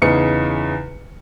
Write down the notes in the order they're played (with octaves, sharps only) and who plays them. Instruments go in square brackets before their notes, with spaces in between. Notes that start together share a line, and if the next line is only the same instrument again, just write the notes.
[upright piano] E2 C#3 D#4 C#7